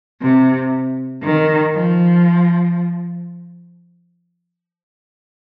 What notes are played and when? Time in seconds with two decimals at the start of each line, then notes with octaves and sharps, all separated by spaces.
0.22 C3
1.23 D#3
1.74 F3